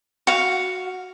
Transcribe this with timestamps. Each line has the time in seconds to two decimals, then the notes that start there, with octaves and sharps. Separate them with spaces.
0.27 F#4 F5